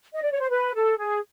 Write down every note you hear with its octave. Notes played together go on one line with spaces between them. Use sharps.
D#5
D5
C#5
C5
B4
A4
G#4